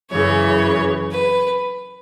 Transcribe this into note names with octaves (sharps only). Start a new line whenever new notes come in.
F#2 C#3 E3 C#5
B4